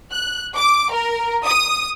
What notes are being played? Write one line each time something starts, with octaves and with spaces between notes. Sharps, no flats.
F#6
D6
A#4
D#6